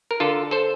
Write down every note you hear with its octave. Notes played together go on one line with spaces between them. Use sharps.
A#4
D3 F4 A4
A4 C5